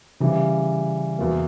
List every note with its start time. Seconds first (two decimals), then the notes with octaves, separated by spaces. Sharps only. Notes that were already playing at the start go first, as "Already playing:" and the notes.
0.20 C#3 E3 G3
1.19 E2 B2 A#3